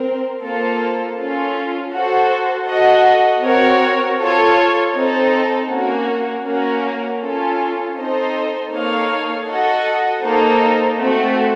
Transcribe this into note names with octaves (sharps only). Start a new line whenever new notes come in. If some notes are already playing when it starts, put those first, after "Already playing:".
Already playing: C4 A#4
A#3 F4 A4 C5
C#4 F4 A4
F#4 A4 C5
F#4 A4 D#5 F#5
C4 F#4 A#4 C#5
F4 A4 C#5
C4 D#4 A4 C5
A#3 C#4 F#4 A#4
A#3 C#4 F#4 A#4
C#4 F4 A4
C4 D#4 A4 C5 D#5
A#3 D#4 A4 C#5 F5
F#4 A4 D#5 F#5
A#3 D#4 A4 C5
A3 C4 F#4